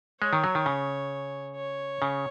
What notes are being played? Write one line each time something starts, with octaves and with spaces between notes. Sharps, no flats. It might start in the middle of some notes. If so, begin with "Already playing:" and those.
G#3 C#5
D#3
F#3
D#3
C#3
C#5
C#3